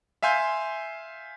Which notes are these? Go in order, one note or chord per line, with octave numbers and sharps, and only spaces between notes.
E5 F5 G#5 C6 G6